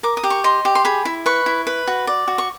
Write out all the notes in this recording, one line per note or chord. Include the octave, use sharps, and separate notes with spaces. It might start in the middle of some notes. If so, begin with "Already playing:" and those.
A#4 D6
D#6
G4
C#6
D#5 C6
G4
C6
G#4 B5
E4
B4 C#6
E4
B4
F#4
D5
F#4
C#6